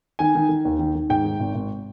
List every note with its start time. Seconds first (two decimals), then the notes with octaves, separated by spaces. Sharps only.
0.19 D#3 G#5
0.35 D#3
0.49 D#3
0.65 D#2
0.79 D#3
0.95 D#3
1.09 G#2 G5
1.25 D#3
1.40 G#1
1.55 G#1